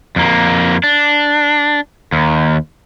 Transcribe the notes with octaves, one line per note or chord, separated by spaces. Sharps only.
F2 A#3
D4
D#2